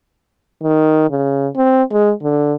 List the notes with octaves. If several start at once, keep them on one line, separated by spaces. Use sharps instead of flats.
D#3
C#3
C4
G#3
D3